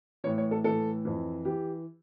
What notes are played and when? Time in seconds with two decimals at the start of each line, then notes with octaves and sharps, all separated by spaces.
0.24 A2 E3 C#5
0.38 C#5
0.51 A4
0.64 A2 E3 A4
1.05 F2 E3
1.45 E3 G4